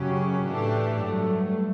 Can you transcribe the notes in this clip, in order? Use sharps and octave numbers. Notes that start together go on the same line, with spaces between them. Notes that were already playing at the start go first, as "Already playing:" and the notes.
Already playing: F#2 C#3 F#3 C#4 G4
A2 E3 A3 D4 G4
G2 F#3 A3